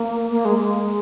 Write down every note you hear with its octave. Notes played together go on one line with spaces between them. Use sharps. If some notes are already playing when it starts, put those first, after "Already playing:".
Already playing: A#3
A#3
G#3
G#3